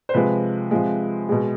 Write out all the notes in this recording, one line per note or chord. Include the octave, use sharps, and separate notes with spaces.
C5
C3 F3 G#3 B4
C3 F3 G#3
B2 G#3 G#4